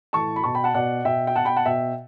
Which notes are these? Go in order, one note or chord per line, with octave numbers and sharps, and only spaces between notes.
A2 E3 A5 C#6
B5
B2 A5 C#6
G5 B5
F#5 A5
B2 D5 F#5
B2 E5 G5
G5
B2 F#5 A5
G5 B5
F#5 A5
B2 E5 G5